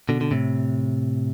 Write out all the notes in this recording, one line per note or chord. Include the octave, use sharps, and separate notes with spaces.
B2 D3
D3
A2 C3